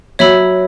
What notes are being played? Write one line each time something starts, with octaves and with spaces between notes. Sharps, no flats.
F#3 C#5 E5 B5 E6